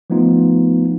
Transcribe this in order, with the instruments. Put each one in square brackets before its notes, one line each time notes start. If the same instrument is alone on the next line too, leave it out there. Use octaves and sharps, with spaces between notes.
[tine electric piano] F3 A3 B3 D#4 F4